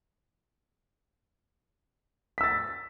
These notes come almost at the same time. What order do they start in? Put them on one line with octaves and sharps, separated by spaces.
B6 E6 A6